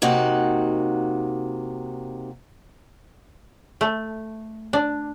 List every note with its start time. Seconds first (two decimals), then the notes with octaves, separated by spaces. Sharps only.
0.02 C3 A#3 D#4 F#4 F#5
3.81 A3
4.73 D4